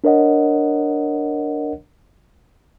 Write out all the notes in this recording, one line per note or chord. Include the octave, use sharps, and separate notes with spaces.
D4 A#4 C#5 D#5 F#5